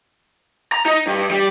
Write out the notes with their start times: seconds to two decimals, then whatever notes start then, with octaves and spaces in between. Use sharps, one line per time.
0.72 A#5
0.86 D#4
1.07 G2
1.31 G3